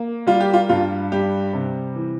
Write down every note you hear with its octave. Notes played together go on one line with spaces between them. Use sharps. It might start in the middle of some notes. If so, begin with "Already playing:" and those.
Already playing: A#3
G3 F4
G4
F4
G2 F4
G3 G4
C3
E3